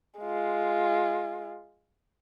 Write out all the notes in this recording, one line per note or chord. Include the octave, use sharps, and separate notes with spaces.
G#3 F4